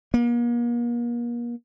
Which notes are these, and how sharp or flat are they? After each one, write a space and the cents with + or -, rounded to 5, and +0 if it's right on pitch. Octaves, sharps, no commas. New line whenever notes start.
A#3 +40